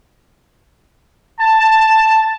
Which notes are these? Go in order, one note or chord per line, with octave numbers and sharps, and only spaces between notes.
A5